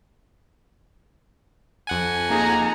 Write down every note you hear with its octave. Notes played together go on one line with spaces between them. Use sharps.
F2 F#5 G#5
A#3 D#4 G#4 A#5